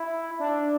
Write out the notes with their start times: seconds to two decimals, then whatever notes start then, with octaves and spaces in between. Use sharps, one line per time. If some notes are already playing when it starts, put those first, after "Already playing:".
Already playing: E4
0.39 D4